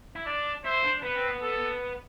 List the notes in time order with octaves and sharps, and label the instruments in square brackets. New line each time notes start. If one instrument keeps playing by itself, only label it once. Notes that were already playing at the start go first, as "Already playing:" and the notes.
[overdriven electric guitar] E4
[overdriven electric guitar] D4 [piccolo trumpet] D5
[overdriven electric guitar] E4 [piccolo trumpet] C5
[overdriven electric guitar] D4
[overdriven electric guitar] B3 [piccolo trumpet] B4
[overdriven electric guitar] C4
B3
[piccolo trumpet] A4